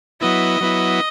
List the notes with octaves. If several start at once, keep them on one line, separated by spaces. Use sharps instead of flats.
F#3 B3 E4 D#5
F#3 B3 E4